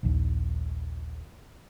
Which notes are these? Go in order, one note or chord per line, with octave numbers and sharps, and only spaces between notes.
A#1 D#2